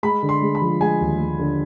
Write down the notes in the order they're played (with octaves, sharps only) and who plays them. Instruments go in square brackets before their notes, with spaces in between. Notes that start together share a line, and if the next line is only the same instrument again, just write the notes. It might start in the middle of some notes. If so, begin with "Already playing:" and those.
[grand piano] G#3 B5
D3
C6
G#3
B5
F3
G#3 G#5
D#2
G#3
D3